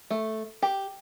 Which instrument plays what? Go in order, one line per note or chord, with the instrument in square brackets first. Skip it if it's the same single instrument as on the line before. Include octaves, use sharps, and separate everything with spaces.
[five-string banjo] A3
G4